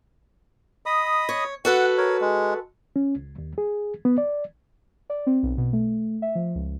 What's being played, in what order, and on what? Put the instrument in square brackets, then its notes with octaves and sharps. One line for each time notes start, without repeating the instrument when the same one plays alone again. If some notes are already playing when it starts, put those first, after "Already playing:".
[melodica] D#5 B5 D#6
[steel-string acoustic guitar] C#5
[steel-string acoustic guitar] F#4 A4 B4 [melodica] F#5
[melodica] A#4 C#5
G#3
[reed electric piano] C#4
C#2
D#2
G#4
B3
D5
[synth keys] D5
C4
B1
B2
A3
E5
F3
C#2